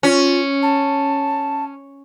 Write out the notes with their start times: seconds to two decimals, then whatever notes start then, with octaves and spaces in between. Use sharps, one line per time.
0.03 C#4 F4
0.63 A5